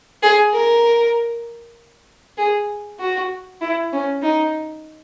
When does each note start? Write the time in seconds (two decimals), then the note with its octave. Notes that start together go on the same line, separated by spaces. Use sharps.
0.23 G#4
0.53 A#4
2.37 G#4
3.00 F#4
3.61 E4
3.93 C#4
4.22 D#4